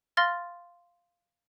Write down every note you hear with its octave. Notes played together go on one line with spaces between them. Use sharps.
F5 C6 F6 A6 A#6